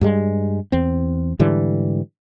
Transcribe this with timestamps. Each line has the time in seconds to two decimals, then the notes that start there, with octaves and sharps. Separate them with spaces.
0.01 G2 G3 G#3
0.72 E2 C4
1.39 G#2 D3 E3 G3